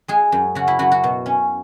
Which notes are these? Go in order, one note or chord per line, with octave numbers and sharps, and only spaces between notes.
G#3 G#4
F#2
C#3 F#4
E4
F#2 F#4
F#4
B2
C#4